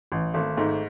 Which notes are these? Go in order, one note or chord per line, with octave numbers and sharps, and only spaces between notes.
A1
G#1 A3
G#2 A3